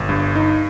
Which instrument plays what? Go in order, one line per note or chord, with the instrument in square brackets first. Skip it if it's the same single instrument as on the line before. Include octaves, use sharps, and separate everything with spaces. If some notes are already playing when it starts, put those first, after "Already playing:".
Already playing: [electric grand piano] G1
G2
D#4